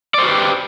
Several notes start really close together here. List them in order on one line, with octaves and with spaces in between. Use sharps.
D5 C5 F#4 B4 G4